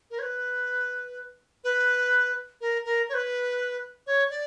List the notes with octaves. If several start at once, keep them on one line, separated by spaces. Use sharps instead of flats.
A#4
C#5
B4
B4
A#4
A#4
C#5
B4
C#5
D5